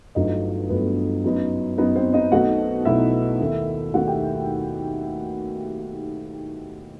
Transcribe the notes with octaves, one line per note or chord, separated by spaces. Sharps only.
G1 G2 F#3 A3 D#4 D#5
G1 G2 F#3 A3 B3 B4
F#2 F#3 B3 D#4
F#2 F#3 B3 D#4 B4
C4 C5
D#4 D#5
B1 B2 A3 D#4 F#4 F#5
B1 B2 A3 D#4 E4 E5
D#2 D#3 A3
D#2 D#3 A3 F#4 F#5
G4 G5